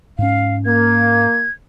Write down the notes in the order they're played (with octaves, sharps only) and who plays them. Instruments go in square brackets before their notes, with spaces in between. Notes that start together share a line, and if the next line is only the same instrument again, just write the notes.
[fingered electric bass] G#2 C#4 [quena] F5
[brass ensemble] A#3 [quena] G#6